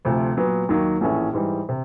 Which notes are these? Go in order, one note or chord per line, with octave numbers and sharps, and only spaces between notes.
D2 C3 F3 A3
A#2 F#3 B3
D#2 D#3 F#3 A#3
A#1 A2 E3 A3 C#4
G#2 E3 G3
C3